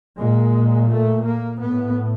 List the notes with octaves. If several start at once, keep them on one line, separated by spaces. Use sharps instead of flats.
A#2 G#3
A3
A#3
A2 B3